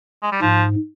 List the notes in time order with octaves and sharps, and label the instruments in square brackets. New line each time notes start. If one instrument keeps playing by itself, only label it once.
[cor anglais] G#3
G3
[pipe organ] G#2 [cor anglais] F3